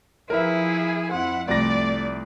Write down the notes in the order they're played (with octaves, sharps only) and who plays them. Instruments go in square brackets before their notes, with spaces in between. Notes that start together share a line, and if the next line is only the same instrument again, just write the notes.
[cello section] F3 [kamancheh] E4 G#4 [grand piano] A#4 B4 E5
[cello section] F2 E4 [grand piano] C4 [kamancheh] F#5
[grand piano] C2 F3 A#6 [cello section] A3 [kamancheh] D5